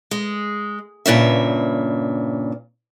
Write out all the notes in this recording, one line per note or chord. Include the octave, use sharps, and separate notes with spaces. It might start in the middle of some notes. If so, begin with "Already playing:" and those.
G#3
G2 A#2 C#3 E5